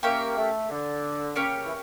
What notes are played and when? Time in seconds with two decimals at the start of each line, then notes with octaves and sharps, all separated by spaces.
0.03 A#3 C#4 G4 A#4 E5
0.37 A3
0.70 D3
1.35 C#3 A#3 C#4 G4 C#5
1.66 E3